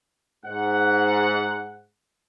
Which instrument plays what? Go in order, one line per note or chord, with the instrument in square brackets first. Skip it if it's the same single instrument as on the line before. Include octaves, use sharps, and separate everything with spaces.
[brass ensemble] G#2 F#5